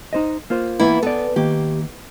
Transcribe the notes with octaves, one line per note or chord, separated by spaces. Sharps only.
D#4 C5 D#5
A#3 F4 C5
E3 A#3 B3 E4 E5
B3 A4 D5
D#3 A#3 G4